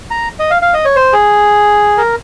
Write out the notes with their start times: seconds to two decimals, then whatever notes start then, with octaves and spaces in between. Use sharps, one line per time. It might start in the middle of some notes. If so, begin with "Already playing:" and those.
0.11 A#5
0.39 D#5
0.51 F5
0.62 F5
0.74 D#5
0.85 C#5
0.96 C5
1.13 G#4
1.98 A#4